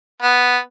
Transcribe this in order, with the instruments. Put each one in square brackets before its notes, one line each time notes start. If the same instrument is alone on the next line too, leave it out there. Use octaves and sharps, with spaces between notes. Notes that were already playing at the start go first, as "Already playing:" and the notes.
[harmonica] B3